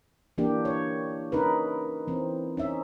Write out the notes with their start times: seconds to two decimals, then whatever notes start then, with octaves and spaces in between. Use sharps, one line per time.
0.38 E3 A#3 D4 G4
0.65 C#5
1.32 C#4 D#4 A#4 B4
2.08 E3 C4
2.57 C#4 D#4 E5